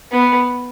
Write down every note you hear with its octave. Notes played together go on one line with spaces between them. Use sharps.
B3